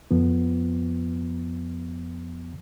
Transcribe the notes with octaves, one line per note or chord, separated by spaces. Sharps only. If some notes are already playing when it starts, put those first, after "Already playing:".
F2 F3 B3